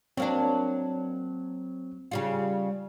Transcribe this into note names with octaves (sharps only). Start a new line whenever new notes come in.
F#3 A#3 C4 D4
C#3 G3 F4